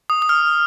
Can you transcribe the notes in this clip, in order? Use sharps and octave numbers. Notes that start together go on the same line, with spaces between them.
D#6
D#6
F6